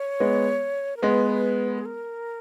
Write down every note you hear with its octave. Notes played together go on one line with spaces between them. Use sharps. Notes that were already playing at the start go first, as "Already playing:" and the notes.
Already playing: C#5
G#3 B3
A#4
G#3 B3 B4
G#4
A#4